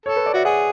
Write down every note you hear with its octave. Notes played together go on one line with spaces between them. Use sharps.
A4 C#5
B4
D5
F#4 E5
G#4 F#5